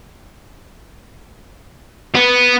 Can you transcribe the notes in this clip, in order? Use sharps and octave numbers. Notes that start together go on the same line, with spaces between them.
B3